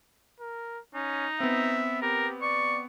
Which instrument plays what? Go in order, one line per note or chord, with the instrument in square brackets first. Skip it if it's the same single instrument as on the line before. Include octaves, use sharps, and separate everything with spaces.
[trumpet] A#4
[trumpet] C#4 [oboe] D#4
[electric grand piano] B3 C4 [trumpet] E5
[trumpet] G4 [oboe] A#4
[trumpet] D5 [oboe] C#6